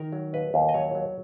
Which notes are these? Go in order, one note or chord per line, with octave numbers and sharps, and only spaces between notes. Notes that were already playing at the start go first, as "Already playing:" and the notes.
Already playing: D#3 A#4
F#3
D#2 B4
D#2
D#5
F#3 C#5
F#3